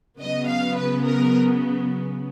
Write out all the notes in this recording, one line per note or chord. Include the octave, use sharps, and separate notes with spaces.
C#3 F#3 B3 D#5
F5
B4
A#4